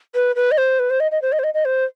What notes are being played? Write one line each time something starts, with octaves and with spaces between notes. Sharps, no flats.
B4
B4
D#5
C5
B4
C5
D#5
D#5
C5
D#5
C5
D#5
D#5
C5